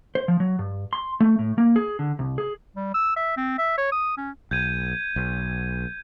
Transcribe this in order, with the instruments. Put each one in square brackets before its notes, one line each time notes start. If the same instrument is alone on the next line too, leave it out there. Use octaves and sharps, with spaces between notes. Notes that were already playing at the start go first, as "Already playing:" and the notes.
[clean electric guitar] C5
F3
F#3
G2
C6
A3
A2
A#3
G#4
D3
C2
G#4
[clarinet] G3
E6
E5
C4
E5
C#5
D#6
C#4
[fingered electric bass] B1 [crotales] G6 G#6 D#7
[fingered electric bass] B1